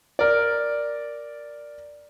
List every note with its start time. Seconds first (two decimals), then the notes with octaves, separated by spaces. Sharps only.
0.19 A#4 D5